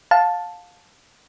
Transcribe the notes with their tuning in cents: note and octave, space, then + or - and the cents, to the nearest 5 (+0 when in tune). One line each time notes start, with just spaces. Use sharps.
F5 +25 A5 +0